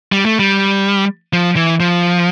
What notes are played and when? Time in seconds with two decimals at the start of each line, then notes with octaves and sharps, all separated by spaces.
0.12 G3
0.26 A3
0.39 G3
1.33 F3
1.56 E3
1.80 F3